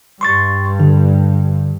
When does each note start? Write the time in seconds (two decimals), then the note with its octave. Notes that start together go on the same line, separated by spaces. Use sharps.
0.21 G2 C6 C#6 A6
0.80 D3